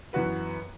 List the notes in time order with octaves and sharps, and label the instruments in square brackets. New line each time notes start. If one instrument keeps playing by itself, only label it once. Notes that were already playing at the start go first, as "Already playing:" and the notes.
[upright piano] F#2 E3 B3 F#4 B4